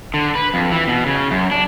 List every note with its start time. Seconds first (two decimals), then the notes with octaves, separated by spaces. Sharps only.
0.14 D3
0.35 B4
0.54 F2
0.72 E3
0.88 B2
1.06 C#3
1.31 F#2
1.51 D4